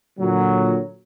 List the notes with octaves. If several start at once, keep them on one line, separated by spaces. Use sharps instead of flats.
A#2 D3 F#3